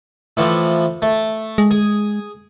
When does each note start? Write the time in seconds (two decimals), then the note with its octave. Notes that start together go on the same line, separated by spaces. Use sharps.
0.37 A2 E3 F3
1.02 A3
1.58 G#3
1.71 G#4